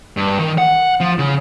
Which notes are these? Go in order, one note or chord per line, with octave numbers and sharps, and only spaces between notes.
G2
D#3
F#5
F3
C#3